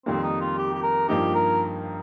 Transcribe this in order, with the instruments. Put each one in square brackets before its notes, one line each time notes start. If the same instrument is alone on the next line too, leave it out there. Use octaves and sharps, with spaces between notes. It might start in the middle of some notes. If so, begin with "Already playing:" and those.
[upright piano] F2 D#3 G3 A#3 [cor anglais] C4
[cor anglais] D#4
F4
G4
G4
A#4
[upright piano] G2 F3 A#3 D#4 [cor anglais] G4
[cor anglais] A#4